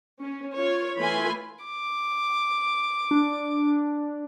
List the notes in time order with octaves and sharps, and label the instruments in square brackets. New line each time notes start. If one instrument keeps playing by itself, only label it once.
[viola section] C#4
F4 C#5
E3 A3 F4 G#5 B5 C6
[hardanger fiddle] D6
[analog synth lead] D4